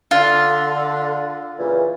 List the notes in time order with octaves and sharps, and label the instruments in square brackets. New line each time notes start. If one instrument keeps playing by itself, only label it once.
[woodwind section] D3 [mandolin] F4
[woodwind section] A#2 C#3 E3